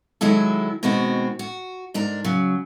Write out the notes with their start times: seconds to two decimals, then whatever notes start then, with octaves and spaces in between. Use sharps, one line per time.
0.21 D#3 F#3 G#3 E4 A4
0.83 B2 D#3 G#3 C4 F#4
1.39 F#4
1.94 G#2 D4 A#4
2.24 C#3 F#3